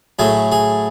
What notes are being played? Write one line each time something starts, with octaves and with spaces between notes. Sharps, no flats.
A2 F#3 A3 G#4
G#4